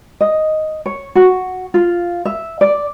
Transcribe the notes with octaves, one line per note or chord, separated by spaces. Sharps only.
D#5
C#5
F#4
F4
E5
D5